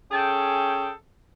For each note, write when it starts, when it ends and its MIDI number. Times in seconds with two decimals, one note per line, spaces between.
0.11 0.91 61
0.11 0.91 68
0.11 0.91 69
0.11 0.91 79